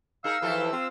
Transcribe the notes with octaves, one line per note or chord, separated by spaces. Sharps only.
D#4 G#4 A#4 F5 E6
E3 F3 G4 A4
C4 F4